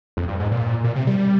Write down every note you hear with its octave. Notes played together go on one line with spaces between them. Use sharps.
F2
G2
G#2
A#2
A#2
C3
G3